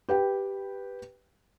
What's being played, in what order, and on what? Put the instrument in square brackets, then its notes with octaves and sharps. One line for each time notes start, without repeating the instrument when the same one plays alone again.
[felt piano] G4 B4 G5